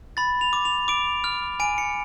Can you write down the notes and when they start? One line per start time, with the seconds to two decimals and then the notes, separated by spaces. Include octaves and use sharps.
0.17 B5 A6
0.41 F7
0.53 D6
0.65 F7
0.88 D6 D7
1.24 F6
1.60 G#5 D7
1.78 C#7